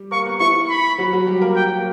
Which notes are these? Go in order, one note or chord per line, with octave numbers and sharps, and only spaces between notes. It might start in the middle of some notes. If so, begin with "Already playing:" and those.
Already playing: G3 G4
A#3 A#4 C#6
B3 B4
E4 C#6
B5
F#3 F#4
F#3 F#4
G3 G4
A#3 A#4
G5
F#3 F#4
A#3 A#4